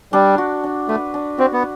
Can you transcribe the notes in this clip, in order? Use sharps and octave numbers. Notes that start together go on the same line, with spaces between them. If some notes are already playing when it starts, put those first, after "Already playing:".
G3 D4
F#4
D4
A3 B4
D4
C4 F#4
B3